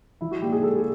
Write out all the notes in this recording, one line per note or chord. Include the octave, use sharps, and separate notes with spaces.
F3 E4
F#4
A#2 G4
G#4
G#3 A4
G#4